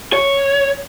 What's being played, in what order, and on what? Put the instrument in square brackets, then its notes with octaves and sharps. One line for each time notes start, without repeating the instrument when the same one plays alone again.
[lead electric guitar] C#5